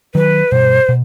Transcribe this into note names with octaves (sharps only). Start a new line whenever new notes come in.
D#3 F#3 B4
G2 B2 C5
B2